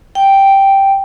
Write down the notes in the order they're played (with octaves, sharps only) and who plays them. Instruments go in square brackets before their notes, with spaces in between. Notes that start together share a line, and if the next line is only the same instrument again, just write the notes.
[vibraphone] G5